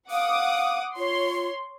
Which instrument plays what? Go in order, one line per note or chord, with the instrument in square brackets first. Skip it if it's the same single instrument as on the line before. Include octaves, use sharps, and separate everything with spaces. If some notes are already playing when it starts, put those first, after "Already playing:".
[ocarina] F5 [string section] F#5 D6 D#6
[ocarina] F4 [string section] C#5 C6